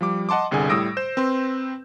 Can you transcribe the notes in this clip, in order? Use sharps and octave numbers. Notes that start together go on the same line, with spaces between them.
F3 G3 D6
D#5 F#5 A5 C6 D6
G1 C2 D3 G#4 G#5
A2 G3 D#6 E6 A#6 D7
C5 G6 E7
C4 B4 C6